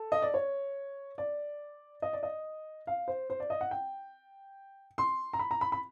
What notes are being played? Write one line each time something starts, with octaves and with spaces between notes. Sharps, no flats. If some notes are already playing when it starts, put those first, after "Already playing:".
Already playing: A4
D#5
D5
C#5
D5
D#5
D5
D#5
F5
C5
C5
D5
D#5
F#5
G5
C6
A#5
B5
A#5
B5
B5